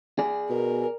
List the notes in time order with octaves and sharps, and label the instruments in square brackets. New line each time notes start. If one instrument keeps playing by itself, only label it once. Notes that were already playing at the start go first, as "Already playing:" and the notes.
[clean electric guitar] G#4 D5
[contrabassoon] B2 [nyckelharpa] A#4